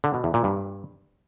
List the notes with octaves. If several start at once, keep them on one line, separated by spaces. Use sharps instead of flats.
D3
B2
E2
A#2
G2